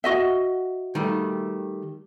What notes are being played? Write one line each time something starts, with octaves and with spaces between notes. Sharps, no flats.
F#4 D#5 E5
D#3 G3 A3